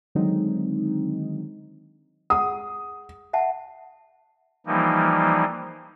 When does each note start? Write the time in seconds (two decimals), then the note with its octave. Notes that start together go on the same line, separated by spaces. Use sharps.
0.15 D3 D#3 F#3 G#3 C4 D#4
2.30 G#4 F#5 D#6
3.33 E5 F#5 A5
4.67 E3 F3 G3 A#3 D#4